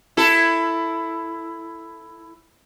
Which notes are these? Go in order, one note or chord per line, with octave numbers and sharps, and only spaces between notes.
E4 A4